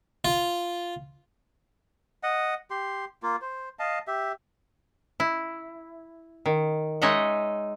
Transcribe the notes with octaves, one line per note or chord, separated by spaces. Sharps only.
F4
D#5 F#5
G4 C6
A#3 F4
C5
D#5 F5 A5
G4 E5
E4
D#3
G#3 D#4 C#5 D#5 E5 F#5